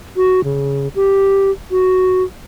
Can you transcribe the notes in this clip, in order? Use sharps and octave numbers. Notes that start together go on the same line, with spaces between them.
F#4
C#3
G4
F#4